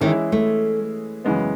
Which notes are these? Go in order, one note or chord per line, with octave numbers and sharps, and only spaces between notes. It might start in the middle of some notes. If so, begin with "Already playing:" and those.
D#3 E3 G#3 C#4 E4 G#4
A3
F#2 C#3 E3 G#3 B3